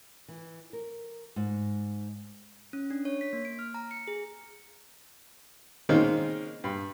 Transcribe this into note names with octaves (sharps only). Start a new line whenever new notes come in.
E3
A#4
G#2
C#4
D4
C#5
B6
A#3
D7
F6
A#5
C#7
G#4
D#3 G#3 A#3 C4 C#4 D#4
G2